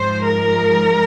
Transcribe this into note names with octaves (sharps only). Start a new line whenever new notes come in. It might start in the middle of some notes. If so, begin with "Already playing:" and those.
Already playing: G#2 F3 G#3 C5
A#4